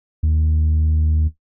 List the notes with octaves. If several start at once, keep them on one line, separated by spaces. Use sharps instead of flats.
D#2